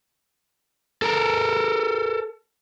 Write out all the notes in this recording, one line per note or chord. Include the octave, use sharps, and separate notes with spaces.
A4 A#4